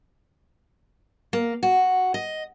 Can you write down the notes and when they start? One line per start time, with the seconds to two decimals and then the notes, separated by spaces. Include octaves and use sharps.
1.33 A#3
1.63 F#4
2.14 D#5